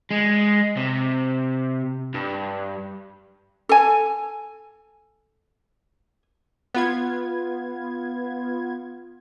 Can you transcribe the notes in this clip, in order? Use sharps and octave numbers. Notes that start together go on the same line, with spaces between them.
G#3
C3
G2
A4 G#5
B3 F4 G#6